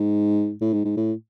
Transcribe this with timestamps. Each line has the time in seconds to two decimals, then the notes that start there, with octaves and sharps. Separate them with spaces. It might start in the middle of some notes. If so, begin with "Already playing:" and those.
Already playing: G#2
0.61 A2
0.73 G#2
0.85 G#2
0.97 A2